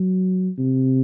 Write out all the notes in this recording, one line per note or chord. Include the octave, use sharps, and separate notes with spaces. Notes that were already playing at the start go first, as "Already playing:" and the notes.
Already playing: F#3
C3